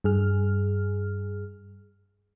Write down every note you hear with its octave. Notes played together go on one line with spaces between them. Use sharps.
G2 G#4 F6